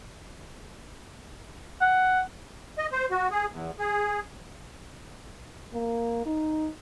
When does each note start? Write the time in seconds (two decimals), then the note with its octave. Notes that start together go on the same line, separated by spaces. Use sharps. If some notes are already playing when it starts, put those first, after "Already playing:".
1.81 F#5
2.78 D#5
2.92 C5
3.11 F#4
3.31 G#4
3.52 E2
3.79 G#4
5.73 A#3
6.26 D#4